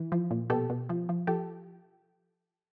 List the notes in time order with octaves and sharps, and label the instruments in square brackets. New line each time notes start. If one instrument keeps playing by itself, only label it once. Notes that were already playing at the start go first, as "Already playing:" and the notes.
Already playing: [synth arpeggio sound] E3
F3
A#2
B2 G4 A4
B2
F3
F3
F3 G4 A4